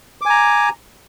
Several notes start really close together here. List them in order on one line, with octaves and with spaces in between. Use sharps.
D6 G#5 A#5